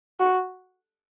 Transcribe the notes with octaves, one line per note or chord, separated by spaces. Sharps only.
F#4